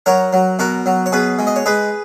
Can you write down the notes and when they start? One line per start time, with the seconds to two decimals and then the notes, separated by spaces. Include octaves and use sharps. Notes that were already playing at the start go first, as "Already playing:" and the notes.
0.06 F#3 A#4 C#5
0.33 F#3
0.59 B2 F#4 A#4
0.86 F#3
1.06 C#5
1.12 B2 G#4 B4
1.39 G#3
1.47 D#5
1.56 C#5
1.66 G#3 G#4 B4